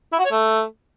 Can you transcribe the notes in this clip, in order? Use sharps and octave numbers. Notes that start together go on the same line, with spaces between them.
E4
F#4
C#5
A3